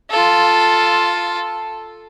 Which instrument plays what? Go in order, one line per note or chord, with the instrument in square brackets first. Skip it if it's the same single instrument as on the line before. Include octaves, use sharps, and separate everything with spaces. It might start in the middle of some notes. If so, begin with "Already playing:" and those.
[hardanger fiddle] F4 A4